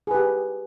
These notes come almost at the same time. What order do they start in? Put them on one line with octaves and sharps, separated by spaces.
G#4 B4 G4